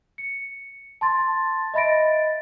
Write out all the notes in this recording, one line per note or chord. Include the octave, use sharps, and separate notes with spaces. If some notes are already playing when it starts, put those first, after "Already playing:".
C#7
A5 C6 A6
D#5 E5 B5 A6 A#6 D7